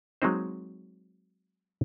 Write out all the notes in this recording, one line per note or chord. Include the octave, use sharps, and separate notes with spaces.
F#3 G#3 A#3 C4 D#4 C5